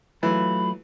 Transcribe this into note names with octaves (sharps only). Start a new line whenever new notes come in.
E3 F#3 A3 F4 B5